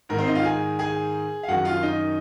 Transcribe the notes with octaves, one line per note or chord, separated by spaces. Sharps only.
G#2 D#3 A#4
C4 C5
D#4 D#5
F4 F5
G#4 G#5
G#4 G#5
F5
F#2 D#3 F#4 F#5
F4 F5
D#4 D#5